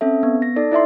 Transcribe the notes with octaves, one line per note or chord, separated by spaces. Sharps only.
C4 C#4 A4 E5
B3
A#6
D#4 A4 D5
E4 D5 E5 C6